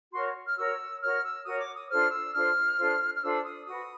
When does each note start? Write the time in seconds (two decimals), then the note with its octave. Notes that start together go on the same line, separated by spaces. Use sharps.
0.12 F#4 A#4 C#5 C6
0.46 F6
0.56 F#4 A#4 C#5 E6
1.01 F#4 A#4 C#5 F6
1.22 E6
1.45 F#4 A#4 C#5 D#6
1.59 D6
1.75 D#6
1.89 D4 F4 A4 C5 F6
2.11 E6
2.33 D4 F4 A4 C5 F6
2.77 D4 F4 A4 C5
3.14 F6
3.22 D4 F4 A4 C5 E6
3.44 D#6
3.66 F#4 B4 D#6